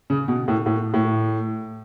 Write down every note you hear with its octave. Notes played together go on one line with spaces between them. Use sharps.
C#3
B2
A2
A2
A2